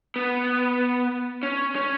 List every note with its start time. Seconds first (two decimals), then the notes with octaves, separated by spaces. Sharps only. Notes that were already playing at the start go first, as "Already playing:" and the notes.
0.16 B3
1.43 C#4
1.75 C#4